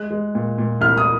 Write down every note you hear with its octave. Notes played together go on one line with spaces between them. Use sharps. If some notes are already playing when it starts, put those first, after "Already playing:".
Already playing: G#3 F#6
G#3
A#2
A#2
C2 F6
D#6